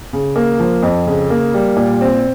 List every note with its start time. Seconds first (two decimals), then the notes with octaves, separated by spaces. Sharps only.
0.13 C#3
0.36 A#3
0.60 F3
0.83 F2
1.07 C#3
1.30 A#3
1.54 G3
1.77 A#2
2.01 C4